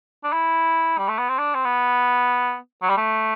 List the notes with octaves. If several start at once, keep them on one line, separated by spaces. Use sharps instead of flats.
D4
E4
G3
A3
B3
C4
D4
C4
B3
F#3
G3
A3